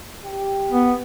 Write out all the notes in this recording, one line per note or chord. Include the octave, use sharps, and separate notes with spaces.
G4
B3